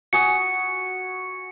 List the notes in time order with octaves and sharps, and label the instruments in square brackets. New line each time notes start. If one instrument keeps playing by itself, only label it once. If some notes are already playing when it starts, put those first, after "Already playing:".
[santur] F#4 G#5 D#6 [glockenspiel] C#7